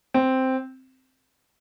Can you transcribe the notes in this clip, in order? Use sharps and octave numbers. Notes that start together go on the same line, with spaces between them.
C4